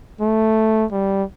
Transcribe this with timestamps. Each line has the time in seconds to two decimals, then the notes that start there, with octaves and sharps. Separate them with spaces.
0.21 A3
0.92 G3